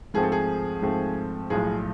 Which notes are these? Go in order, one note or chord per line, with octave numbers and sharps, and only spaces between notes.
G#2 F3 A3 C4 G#4
A4
G#4
G#2 F3 A3 C4
B1 A2 F3 G#3 G#4